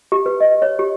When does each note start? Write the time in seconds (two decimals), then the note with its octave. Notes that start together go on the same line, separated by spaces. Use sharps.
0.12 G4
0.26 B4
0.40 D#5
0.62 C#5
0.79 G4